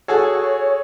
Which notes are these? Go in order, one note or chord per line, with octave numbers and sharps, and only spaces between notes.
F#4 G#4 A4 C#5